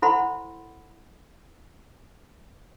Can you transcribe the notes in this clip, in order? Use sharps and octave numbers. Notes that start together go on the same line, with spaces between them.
E4 A4 C5 F#5 B5 C6